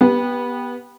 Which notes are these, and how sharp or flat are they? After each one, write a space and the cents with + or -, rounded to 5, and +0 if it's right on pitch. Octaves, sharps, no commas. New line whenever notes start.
B3 -20 G4 +10